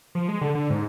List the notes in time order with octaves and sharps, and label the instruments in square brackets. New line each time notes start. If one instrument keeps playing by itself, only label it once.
[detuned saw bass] F3
G#3
D3
D3
G#2